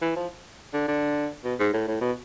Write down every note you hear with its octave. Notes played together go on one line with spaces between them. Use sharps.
E3
F3
D3
D3
B2
G#2
A2
A2
B2